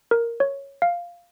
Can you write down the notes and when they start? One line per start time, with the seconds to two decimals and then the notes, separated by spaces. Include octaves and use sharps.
0.11 A#4
0.40 C#5
0.82 F5